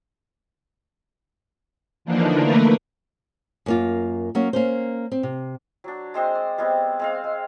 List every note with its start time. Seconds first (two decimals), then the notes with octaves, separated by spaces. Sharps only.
2.05 D3 E3 F3 A#3 D4 D#4
2.39 A3 A#3 A#4 B4
3.66 F#2 A#3 F4
4.35 F#3 A#3 C#4
4.53 A#3 C#4 C5
5.12 C4
5.23 C3
5.84 F#3 D4
6.14 G#3 C4 C5 D#5
6.35 D5
6.58 G3 G#3 B3 C4
6.99 G#3 C4 F5
7.24 G#3